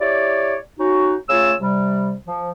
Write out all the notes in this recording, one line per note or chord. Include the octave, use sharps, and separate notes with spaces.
E4 G4 C#5 D5
C#4 D#4 F#4
C#3 A3 F4 C#5 E6
C3 G3
F3